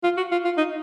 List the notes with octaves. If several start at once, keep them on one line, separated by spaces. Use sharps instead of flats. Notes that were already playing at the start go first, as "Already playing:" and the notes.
F4
F#4
F4
F4
D#4